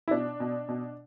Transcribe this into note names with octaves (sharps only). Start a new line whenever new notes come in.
E4
B2 D4
B2
B2